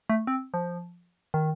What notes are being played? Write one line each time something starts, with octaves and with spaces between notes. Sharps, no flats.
A3
C4
F3
D#3